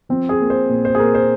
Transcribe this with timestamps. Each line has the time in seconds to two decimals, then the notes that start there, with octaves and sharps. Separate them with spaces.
0.09 F3 C4
0.29 G#4
0.40 A#3
0.50 C5
0.69 A#2
0.85 C5
0.95 G#4
0.99 A#2 A#4
1.15 C5